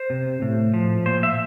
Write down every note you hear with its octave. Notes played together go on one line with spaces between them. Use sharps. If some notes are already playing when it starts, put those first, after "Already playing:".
Already playing: C5
C3
A2
F3
A#2 C5
E5